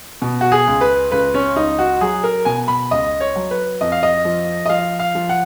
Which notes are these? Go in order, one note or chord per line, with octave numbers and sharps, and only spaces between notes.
B2
F#4
G#4
C#2
B4
C#2 B4
C#4
C#2 D#4
F#4
F#3 G#4
A#4
B2 G#5
B5
C#2 D#5
C#5
F#3
B4
F2 D#5
F5
D#5
F3
D#5
F3 F5
F5
F3
F#5